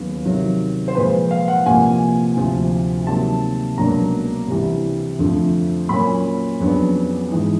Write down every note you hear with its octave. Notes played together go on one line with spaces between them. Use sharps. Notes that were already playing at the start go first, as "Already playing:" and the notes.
Already playing: D#2 C#3 F#3 B3
C3 D#3 F#3
C5
A#2 F3 G#3 B4
F5
F#5
C2 A#2 F3 A#3 G#5
D2 C3 F3
C3 D#3 F#3 A#3 A5
C#2 B2 F#3 A#3 D4 A#5
C2 C3 E3 G3
F2 D3 F3 A3
A#2 F#3 A#3 C#4 B5
F2 C#3 F#3 B3 D4
G#2 E3 G#3